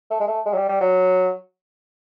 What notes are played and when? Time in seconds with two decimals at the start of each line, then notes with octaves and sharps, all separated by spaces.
0.11 A3
0.20 G#3
0.28 A3
0.46 G#3
0.53 F#3
0.57 G3
0.69 G3
0.81 F#3